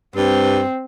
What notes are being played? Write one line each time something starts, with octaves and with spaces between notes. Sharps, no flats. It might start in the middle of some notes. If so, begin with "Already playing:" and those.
G2 C4